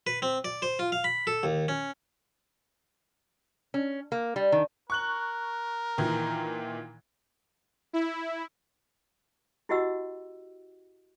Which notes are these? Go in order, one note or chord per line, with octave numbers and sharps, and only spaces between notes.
B4
C4
D5
C5
F4
F5
B5
A4
D#2
C#4
C#4
A#3
G3
D#3
A#4 C#6 F#6 F#7
A#2 D#3 E3
E4
E4 F#4 G4 D#5 F#5 E6